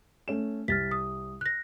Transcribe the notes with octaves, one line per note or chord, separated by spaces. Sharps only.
A3 C#4 E7
C2 F6 A6 B6
D#6
F#6 A#6